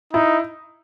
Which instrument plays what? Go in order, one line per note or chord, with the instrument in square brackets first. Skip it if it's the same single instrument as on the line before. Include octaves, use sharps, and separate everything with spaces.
[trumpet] D#4 [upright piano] E4